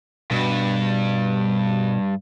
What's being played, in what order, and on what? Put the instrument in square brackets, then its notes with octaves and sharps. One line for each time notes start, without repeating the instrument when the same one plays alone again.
[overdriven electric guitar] G2 [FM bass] B2